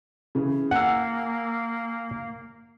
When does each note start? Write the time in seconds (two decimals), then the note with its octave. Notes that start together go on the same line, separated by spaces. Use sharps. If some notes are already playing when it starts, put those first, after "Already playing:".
0.35 C#3 E3 G#4
0.71 A#3 F#5 G#5 E6